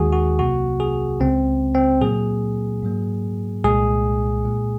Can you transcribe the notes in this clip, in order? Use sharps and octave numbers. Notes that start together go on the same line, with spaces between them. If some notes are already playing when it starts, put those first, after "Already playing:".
Already playing: D#2 D#3 G#3 F#4 G#4
F#4
C2 C3 F#3 A#3 F#4
G#4
C#2 C#3 G#3 C4
C4
A#2 F#3 A#3 G#4
G#2 F#3 A#3
C2 A#2 G#3 G#4
A#2 G#3